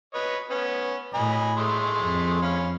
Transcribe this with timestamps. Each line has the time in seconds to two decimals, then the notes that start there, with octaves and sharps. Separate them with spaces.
0.14 B4 C#5 D#5
0.50 B3 C#4
1.14 A2 D#5 G#5 B5
1.58 G#3 A3 C6
2.03 F2
2.42 C#4 F5 B5